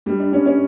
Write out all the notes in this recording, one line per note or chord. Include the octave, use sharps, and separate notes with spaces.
G2 G3
D4
G2 C#4
C#4